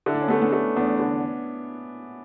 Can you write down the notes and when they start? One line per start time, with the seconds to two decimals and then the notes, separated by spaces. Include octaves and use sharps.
0.06 D3 E4
0.14 D4
0.22 C#4
0.28 A3 B3 D4
0.42 B3 D4
0.53 A3
0.76 E2 B3 D4
1.00 D3